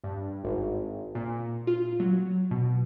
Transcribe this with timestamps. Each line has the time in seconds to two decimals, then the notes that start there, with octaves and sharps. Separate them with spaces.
0.04 G2
0.44 G#1
1.15 A#2
1.67 F4
2.00 F#3
2.51 B2